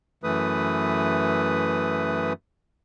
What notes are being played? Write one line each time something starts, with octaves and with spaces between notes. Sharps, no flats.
F#2 E3 A3 B4 D#6